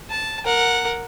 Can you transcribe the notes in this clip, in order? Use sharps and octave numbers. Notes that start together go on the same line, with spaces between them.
A5
A#4 F#5